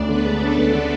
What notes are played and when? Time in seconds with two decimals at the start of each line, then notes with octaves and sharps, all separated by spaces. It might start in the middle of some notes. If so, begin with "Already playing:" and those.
Already playing: D2 C#4 D4 D5
0.09 D3 B3 B4
0.25 G#3
0.41 A3 C#4 A4
0.57 D2
0.73 D3